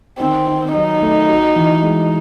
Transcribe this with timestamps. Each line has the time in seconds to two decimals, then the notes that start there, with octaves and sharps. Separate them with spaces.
0.19 D#3 C4
0.47 D#3
0.74 F#3 D#4
1.02 A3
1.28 F#4
1.56 E3
1.83 G#3